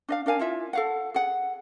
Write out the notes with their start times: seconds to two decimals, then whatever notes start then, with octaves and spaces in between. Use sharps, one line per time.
0.09 D4 D#5 F5
0.26 D4 A#4 F5 G#5
0.39 E4 F4 E5
0.73 A4 F5 F#5
1.14 G#4 F#5